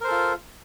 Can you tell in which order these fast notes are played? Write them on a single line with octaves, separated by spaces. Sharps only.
A#4 C5 A4 F4